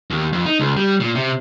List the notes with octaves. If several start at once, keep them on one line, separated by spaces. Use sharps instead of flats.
D#2
F2
D#4
C#2
G3
A#2
C3